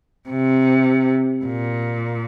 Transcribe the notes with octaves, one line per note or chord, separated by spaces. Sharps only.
C3
A#2